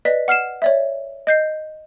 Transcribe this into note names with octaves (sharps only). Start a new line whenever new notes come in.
B4 D5 D#5 B6
F#5 F6 C7 E7
C#5 D5 E5
D#5 G6 C7